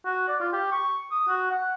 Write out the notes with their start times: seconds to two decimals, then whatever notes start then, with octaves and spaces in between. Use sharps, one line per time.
0.05 F#4
0.28 D5
0.40 F4
0.53 G4
0.72 C#6
1.11 D#6
1.28 F#4
1.51 F#5